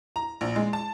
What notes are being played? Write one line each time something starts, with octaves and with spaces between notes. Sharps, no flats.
A#5
A#1
G#3
A5